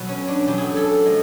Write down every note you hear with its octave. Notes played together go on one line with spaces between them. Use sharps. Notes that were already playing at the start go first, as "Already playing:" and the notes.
Already playing: B2 F#3
C#4
D4
B2 F#3 G4
G#4 A4
A4
F3 G#3